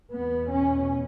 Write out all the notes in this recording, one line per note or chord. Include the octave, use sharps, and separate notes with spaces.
E2 B2 B3
C#4